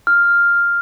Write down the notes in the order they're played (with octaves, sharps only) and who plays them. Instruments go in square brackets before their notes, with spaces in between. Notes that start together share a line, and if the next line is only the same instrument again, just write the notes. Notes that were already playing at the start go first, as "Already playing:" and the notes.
[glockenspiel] F6